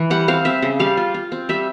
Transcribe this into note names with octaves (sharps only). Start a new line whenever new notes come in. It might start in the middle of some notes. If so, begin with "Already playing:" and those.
Already playing: E3
G3 F#5
C4 F5
C4 E5
C#3
G3 F5
F4
F4
C4
G3 E5